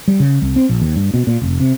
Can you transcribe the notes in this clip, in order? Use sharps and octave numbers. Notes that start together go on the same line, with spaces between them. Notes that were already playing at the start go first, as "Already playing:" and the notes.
G3
C#3
C2
C4
A#1
D#2
G2
B2
A#2
F1
C3